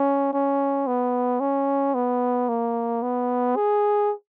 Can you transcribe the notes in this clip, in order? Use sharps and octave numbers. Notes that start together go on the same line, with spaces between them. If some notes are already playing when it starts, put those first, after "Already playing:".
Already playing: C#4
C#4
B3
C#4
B3
A#3
B3
G#4